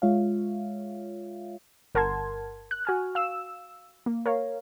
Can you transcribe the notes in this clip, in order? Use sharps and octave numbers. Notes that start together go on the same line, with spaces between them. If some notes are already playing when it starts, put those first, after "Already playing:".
G#3 F4 C#5 E5 F5
G1 A#4 F#5 A5 C6 G#6
F#6
F#4 G#5 F6
F5 E6 E7
A#3
A#4 C#5 F5